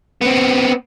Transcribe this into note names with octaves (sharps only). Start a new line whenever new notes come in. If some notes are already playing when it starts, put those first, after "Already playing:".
B3 C4